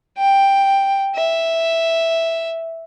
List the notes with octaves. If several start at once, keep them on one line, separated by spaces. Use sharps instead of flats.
G5
E5